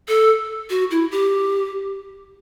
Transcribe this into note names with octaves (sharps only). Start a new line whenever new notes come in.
A4
F#4
E4
G4